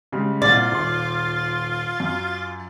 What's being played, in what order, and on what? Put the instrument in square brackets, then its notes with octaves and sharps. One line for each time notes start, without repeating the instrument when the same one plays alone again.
[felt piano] C#3 G3 G#3
[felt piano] C2 A#2 [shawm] F4 [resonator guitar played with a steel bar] D5
[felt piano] D#1 C6
F#2